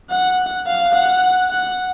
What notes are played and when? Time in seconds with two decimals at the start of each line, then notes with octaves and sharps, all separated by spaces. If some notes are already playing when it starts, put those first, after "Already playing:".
0.10 F#5
0.66 F5
0.94 F#5
1.51 F#5